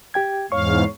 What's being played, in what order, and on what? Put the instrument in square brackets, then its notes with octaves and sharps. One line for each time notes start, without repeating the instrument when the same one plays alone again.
[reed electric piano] G4 G5 G#6
[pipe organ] E2 G#2 F5 [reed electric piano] C#5 C#6